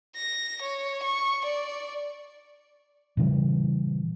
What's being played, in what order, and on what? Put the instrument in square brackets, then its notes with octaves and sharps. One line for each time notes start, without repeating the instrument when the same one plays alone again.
[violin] A#6
C#5
C#6
D5
[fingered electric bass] A#2 C#3 E3 G3